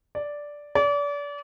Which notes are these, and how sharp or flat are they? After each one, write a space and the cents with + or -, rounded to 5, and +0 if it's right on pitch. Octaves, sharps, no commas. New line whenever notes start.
D5 -5
D5 -35